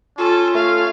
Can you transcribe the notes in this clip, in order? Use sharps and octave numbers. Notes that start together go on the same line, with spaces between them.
C#4 F4 A4
A3 F5